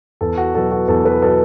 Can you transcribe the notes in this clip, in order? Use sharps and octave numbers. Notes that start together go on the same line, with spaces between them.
E2 A4
F#4
B2 F#3 B3 A4
F#4
E2 A4
B4
B2 F#3 B3 A4